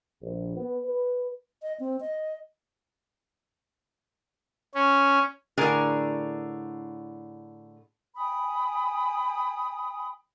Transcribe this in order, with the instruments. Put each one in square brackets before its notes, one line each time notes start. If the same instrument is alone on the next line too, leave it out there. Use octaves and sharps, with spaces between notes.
[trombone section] A#1
B3
B4
[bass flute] D#5
C4
D#5
[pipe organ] C#4
[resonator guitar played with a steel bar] A2 D3 G#4 A#4
[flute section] G5 G#5 B5 D#6